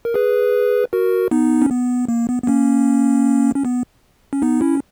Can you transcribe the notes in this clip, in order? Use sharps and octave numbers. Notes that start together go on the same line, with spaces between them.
A#4
G#4 B4
F#4 A#4
B3 D#4
C#4
B3
A#3
B3
B3
A#3 C#4
C#4
B3
C#4
B3 D#4
C#4 E4